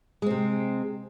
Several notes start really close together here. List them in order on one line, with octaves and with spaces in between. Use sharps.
G#3 C4 C3